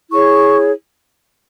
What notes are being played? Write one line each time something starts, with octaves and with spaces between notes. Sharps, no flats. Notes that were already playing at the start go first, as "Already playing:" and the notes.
E4 G#4 C#5 C#6